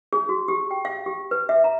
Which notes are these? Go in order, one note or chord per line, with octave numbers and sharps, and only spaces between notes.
G#4
F#4
G4
G5
F5
G4
B4
E5
A#5